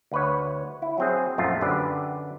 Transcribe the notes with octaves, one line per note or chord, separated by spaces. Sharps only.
D2 B4 C#5
E4
F#3 C4 G#4
A#1 F#2 A3 F4
F#2 D3 G4 B4 D5